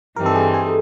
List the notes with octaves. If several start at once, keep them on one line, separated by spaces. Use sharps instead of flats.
G2 E3 G3 C4 D#4 A#4
A4
G#4
G#4